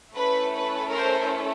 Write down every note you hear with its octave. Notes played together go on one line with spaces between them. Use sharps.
A3 C#4 E4 A4 B4
B4
A#4 C5